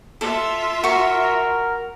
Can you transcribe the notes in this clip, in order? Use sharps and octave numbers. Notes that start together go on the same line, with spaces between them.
F4 A4 E5
F#4 A#4 C#6